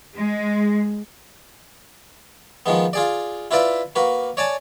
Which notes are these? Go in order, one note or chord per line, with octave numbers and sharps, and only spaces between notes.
G#3
D#3 F3 G#3 B3
F4 G#4 D5
E4 F4 B4 D5 E5
A#3 F#4 B4
C#5 D5 G#5 A5